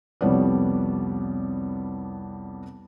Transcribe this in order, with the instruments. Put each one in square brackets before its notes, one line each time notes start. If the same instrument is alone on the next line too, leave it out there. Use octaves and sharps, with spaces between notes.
[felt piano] C2 F2 G3 B3 C#5 D5